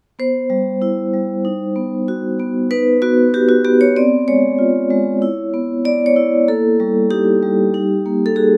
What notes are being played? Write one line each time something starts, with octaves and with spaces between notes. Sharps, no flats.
B3 C5
G3
E4
G3
D#4
B3
F#4
B3
D#4 B4
B3 F#4
F#4 G4
F#4
B3 G4
C#5
C4 D5
G#3 C#5
F4
G#3
E4
B3
B3 D5
C#5
E4
A#3 A4
G3
D#4 G4
G3
D#4
A#3
A4
F#4 G#4